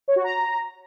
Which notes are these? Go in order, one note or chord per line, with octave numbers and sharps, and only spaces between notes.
C#5
F#4
A#5